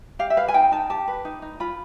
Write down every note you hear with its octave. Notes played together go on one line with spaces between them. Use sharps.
G4 F5
E5
B4 F5
G#5
D#4 G5
D#4 A5
G4 A5
B4
D#4
D#4
F4 B5